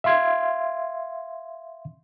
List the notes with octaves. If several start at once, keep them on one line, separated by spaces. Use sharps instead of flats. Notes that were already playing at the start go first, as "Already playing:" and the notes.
E5 F5 C6 G#6